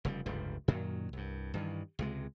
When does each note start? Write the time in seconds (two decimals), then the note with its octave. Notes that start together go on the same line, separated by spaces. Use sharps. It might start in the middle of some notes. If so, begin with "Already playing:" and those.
0.05 F1 C#3 G3
0.26 F1 C#2 G2 G3
0.68 F#2 A#2 D#3 F#3
1.13 C2 G2
1.54 G2 D#3 E3
1.99 C#2 C3 G#3